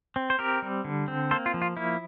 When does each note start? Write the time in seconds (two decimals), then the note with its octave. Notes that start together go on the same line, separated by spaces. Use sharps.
0.16 C4
0.30 C5
0.39 C4 G4 A#4
0.62 G3
0.84 D3
1.08 C4
1.31 A#3 A4 C5
1.46 F4
1.54 F3
1.62 F4
1.77 A#3 E4